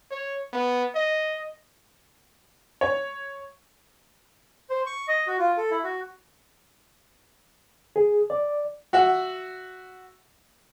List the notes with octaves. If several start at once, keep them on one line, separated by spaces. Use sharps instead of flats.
C#5
B3
D#5
C#5
C5
C#6
D#5
F#4
F4
A4
E4
F#4
G#4
D5
F#4 E5 F#5